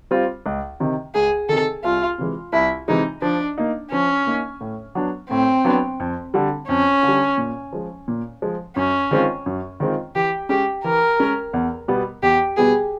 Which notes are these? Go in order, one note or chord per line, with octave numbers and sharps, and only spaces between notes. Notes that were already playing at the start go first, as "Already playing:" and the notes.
G3 C4 F4
C#2
C3 D#3
C#2 G#4
C3 D#3 A4
C2 F4
C3 E3 G#3
C2 E4
C3 E3 G#3 D#4
F3 D4
A#3 D#4
F3 C#4
A#3 D#4
A2
F#3 B3 D4
A2 C4
F#3 B3 D4
F2
D3 G3
F2 C#4
D3
G3
A#2
F3 G#3
A#2
F3 G#3
F#2 C#4
D#3 G#3 C4 F4
F#2
D#3 G#3 C4 F4
E3 G4
G#3 C#4 G4
E3 A#4
G#3 C#4
E2
B2 G3 B3
E2 G4
B2 G3 B3 G#4